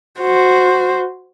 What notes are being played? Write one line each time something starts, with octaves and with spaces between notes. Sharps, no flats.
F#4 C5